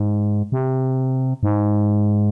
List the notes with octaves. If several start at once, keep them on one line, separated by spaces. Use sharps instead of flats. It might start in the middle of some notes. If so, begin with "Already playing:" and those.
Already playing: G#2
C3
G#2